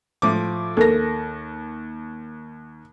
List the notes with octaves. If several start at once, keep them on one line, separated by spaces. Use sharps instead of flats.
A2 F3 D6
D#2 A4 A#4 A#6